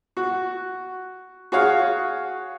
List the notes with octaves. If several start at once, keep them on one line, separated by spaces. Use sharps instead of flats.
F#4
F#4 G#4 C#5 F5